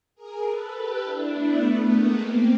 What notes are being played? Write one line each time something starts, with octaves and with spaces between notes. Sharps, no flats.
G#4 A#4
A4 B4
G4 A4
D4 E4
A3 B3
A3 B3
G#3 A#3
A#3 C4